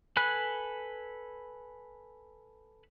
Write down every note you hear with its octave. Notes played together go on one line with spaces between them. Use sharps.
A4 B4 G#5 B5 F#6